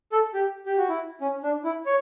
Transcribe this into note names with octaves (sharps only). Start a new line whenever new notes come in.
A4
G4
G4
F#4
E4
C#4
D4
E4
C#5